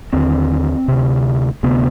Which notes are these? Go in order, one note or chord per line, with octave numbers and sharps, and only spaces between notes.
D#2 D3 C4
D2 C3
D2 C3 B3